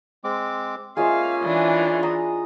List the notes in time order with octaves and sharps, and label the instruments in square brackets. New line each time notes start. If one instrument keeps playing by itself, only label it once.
[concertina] G#3 C4 D6
[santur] G#3 F4 E5 [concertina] A#3 C#4 G#5 [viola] F5
[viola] E3 D4
[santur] D#5 A#5 D#6